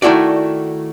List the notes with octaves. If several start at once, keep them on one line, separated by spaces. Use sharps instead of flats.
D#3 A3 E4 F#4 D5